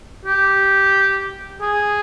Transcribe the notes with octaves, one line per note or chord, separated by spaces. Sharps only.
G4
G#4